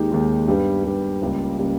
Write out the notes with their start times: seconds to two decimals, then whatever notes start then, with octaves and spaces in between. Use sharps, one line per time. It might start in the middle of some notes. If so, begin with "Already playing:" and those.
Already playing: D#2 D#3 G#3 D#4 G4
0.11 D#2 D#3 G#3 D#4 G4
0.47 G2 G3 B3 G4
0.84 G2 G3 B3 G4
1.21 C#2 C#3 G3 A#3
1.58 C#3 G3 A#3